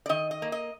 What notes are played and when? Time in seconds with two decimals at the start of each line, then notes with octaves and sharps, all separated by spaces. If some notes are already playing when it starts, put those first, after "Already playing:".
0.06 D5
0.09 D#3 D#5
0.31 D#5
0.42 A#3
0.52 D#5